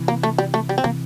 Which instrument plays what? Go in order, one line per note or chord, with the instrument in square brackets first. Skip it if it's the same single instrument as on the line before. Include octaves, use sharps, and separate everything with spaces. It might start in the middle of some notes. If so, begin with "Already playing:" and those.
Already playing: [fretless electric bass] C3 E3
[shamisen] A#3
A3
G3
A3
G3
C4
[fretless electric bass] C3 E3 [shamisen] A#3